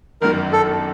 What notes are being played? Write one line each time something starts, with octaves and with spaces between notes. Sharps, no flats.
G1 F#2 D#3 A#4
A4